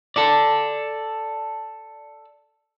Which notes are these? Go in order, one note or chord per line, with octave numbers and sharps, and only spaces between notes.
A4 D5